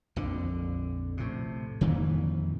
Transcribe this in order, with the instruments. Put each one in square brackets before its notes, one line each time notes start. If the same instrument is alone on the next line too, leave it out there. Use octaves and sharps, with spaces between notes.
[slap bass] A#1 F2 D3
A2 C3
F2 A#2 D#3 E3